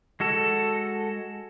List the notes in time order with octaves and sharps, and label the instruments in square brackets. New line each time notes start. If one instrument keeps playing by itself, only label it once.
[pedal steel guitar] G#3 F#4 A4